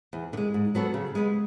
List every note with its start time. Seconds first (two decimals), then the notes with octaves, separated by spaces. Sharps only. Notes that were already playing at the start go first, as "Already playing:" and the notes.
0.13 E2
0.33 D3
0.37 G#3
0.54 G#2
0.75 F#3 B3 F#4 A4
0.94 C#3
1.15 G#3 B3